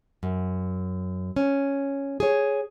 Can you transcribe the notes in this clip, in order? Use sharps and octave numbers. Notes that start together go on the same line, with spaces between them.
F#2
C#4
G#4 C#5